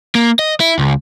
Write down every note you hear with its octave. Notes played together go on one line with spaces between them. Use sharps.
A#3
D#5
E4
C#2